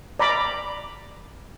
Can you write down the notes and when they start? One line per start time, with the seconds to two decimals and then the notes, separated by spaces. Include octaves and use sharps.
0.19 D5 A#5 B5 D6